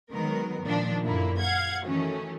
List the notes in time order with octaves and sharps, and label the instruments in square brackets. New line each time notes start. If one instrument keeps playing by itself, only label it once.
[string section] D#3 F#3 G#3 B3 A#4
A#2 D#3 F3 D4
F#2 A#2 D3 A#3 E4
F5 F#5 G#6
D#3 E3 F#3 A3 C#4